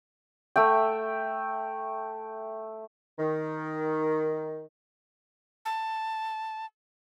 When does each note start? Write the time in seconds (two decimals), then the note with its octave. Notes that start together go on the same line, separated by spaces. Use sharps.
0.56 A3 E5 G5
3.18 D#3
5.65 A5